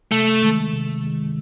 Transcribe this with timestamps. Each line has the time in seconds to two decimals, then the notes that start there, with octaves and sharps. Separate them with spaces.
0.12 C3 A3
0.43 D#3 G#3
0.73 C3
1.04 D#3 G#3